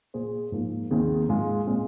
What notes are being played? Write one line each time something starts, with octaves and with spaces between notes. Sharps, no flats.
A#2 A#3 G#4 C5
G#2 F3 A#3 D#4
D#2 D#3 C4 G#4
G#2 G#3 F4
A#2 G#3 C4 F4